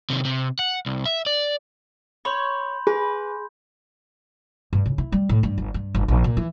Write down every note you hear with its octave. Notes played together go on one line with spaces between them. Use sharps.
C3 D#3
C3
F#5
C2
E5
D5
C#5 B5 C6 G6
G#4 B4
G2
C#3
E4
G3
A2
G2
G1
G2
G1
A#1
A#2
E3